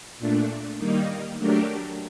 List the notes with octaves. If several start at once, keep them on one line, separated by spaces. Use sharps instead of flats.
A#2 A3 D4
D#3 G3 A#3 D#4
F#3 A3 D4 G4 A#4